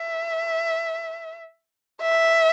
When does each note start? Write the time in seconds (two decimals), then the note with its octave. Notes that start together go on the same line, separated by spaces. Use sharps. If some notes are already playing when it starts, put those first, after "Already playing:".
Already playing: E5
2.02 E5